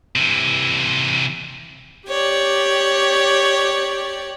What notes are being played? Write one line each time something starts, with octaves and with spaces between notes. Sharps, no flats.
C3 E3
G4 C#5 D5